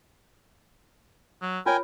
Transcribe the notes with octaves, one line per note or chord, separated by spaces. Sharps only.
F#3
F4 A#4 C#5 G5 G#5